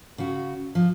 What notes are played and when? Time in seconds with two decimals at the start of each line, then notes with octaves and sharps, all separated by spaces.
0.18 C#3 F#4
0.75 F3